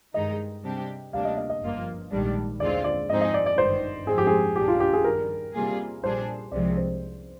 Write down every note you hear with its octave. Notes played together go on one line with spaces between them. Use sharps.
G2 D#3 G#3 D#4 D#5
C3 G3 D4 G4
D2 C3 G3 A#3 D4 F5
D#5
D#5
D#5
G1 G2 F3 A#3 F4
A#1 G#2 D#3 G3 D4
D#2 D3 G#3 C4 F4 D5
D5
G#2 F3 C4 D#4 G#4 D#5
D#5
D5
D5
G1 G2 D#3 C5
G#2 F3 C4 G#4
G4
G#4
A#1 A#2 G3 D4 G4
F4
G4
G#4
G2 D#3 G3 A#4
C3 G3 A#3 F4 G#4
A#1 A#2 G3 D4 G#4 C5
C2 C3 F3 G#3 D5
C5